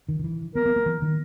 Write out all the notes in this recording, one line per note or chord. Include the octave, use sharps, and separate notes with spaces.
D#3
D#3
E3
B3 A#4
B3
A#3
E3
D#3